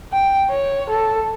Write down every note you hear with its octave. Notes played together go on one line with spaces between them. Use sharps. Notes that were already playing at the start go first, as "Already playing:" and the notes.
G5
C#5
A4